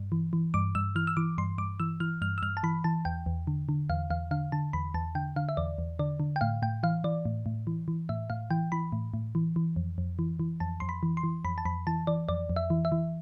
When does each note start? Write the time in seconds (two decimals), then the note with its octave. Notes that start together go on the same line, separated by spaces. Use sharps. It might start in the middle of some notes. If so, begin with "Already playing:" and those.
Already playing: G2
0.12 E3
0.33 E3
0.54 G2 D6
0.75 G2 E6
0.96 E3 F6
1.07 E6
1.17 E3 D6
1.38 G2 C6
1.58 G2 D6
1.80 E3 E6
2.00 E3 F6
2.22 G2 F6
2.38 E6
2.42 G2 F6
2.57 A5
2.63 E3 B5
2.84 E3 A5
3.05 E2 G5
3.26 E2
3.47 D3
3.69 D3
3.90 E2 F5
4.10 E2 F5
4.31 D3 F5
4.52 D3 A5
4.73 E2 B5
4.94 E2 A5
5.15 D3 G5
5.36 D3 F5
5.49 E5
5.57 E2 D5
5.78 E2
5.99 D3 D5
6.20 D3
6.36 G5
6.41 A2 F5
6.62 A2 G5
6.83 E3 F5
7.04 E3 D5
7.25 A2
7.46 A2
7.67 E3
7.88 E3
8.09 A2 E5
8.30 A2 F5
8.51 E3 G5
8.72 E3 B5
8.92 A2
9.14 A2
9.35 E3
9.56 E3
9.76 F2
9.98 F2
10.19 E3
10.40 E3
10.60 F2 A5
10.80 F2 C6
10.89 B5
11.03 E3
11.17 C6
11.24 E3
11.45 F2 B5
11.58 A5
11.65 F2 B5
11.87 E3 A5
12.07 E3 D5
12.29 F2 D5
12.49 F2
12.56 E5
12.70 E3
12.85 E5
12.92 E3